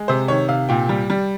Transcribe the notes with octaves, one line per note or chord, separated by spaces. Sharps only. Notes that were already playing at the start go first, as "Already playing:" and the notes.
Already playing: G#3
C3 C5
D#3 C#5
C3 F5
A#2 G5
G3
G3